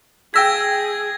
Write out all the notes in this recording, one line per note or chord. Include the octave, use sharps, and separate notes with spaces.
G#4 G5 E6 G#6 A#6 B6